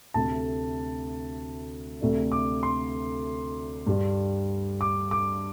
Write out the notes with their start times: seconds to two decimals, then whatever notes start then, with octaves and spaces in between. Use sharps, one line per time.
0.14 D2 C3 A3 A5
2.01 D2 C3 A3 D4
2.32 D6
2.63 C6
3.87 G2 G3 D4
4.81 D6
5.11 D6